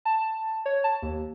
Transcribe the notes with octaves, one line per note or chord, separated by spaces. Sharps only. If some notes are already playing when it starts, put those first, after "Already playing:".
A5
C#5
A5
D#2